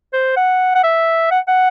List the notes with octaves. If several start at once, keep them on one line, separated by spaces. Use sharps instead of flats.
C5
F#5
F#5
E5
F#5
F#5